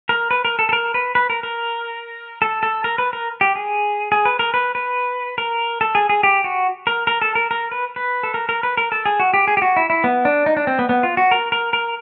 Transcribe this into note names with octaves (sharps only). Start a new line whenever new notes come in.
A#4
B4
A#4
A4
A4
A#4
B4
B4
A#4
A#4
A4
A4
A#4
B4
A#4
G4
G#4
G#4
B4
A#4
B4
B4
A#4
A4
G#4
G#4
G4
F#4
A#4
A#4
A4
A#4
A#4
B4
B4
A4
A#4
A#4
B4
A#4
A4
G#4
F#4
G4
G#4
G4
F#4
E4
E4
B3
D4
D#4
D4
C4
B3
B3
F4
F#4
A#4
A#4
A#4